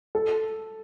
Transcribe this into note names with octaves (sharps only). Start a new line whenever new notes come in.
A4